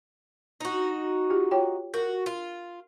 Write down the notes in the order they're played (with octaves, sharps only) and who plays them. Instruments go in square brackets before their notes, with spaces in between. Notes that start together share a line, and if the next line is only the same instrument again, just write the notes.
[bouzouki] D#4 F#4
[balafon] F4 G4
F4 C#5 G5
[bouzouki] F#4 [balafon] A#4
[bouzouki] F4